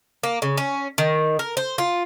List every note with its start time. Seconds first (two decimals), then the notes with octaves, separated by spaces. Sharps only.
0.23 A#3
0.42 C#3
0.58 C#4
0.98 D#3
1.39 A#4
1.57 C5
1.78 F4